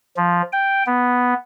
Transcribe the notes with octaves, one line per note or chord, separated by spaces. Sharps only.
F3
G5
B3